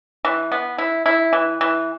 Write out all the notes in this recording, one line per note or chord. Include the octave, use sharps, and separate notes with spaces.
E3
B3
E4
E4
E3
E3